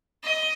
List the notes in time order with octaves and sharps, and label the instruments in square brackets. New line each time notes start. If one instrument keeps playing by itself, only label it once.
[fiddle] D#5